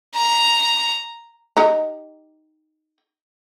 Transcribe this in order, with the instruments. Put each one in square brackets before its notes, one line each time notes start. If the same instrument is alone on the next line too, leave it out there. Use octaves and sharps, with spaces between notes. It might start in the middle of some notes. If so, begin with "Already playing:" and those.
[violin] A#5
[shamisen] D#4 G4 A#5